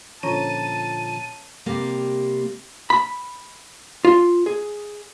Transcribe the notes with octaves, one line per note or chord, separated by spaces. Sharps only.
A#2 D3 F3 C#4 C#5 A5 A#5 D#7
C3 G3 A#3
B5
F4
G#4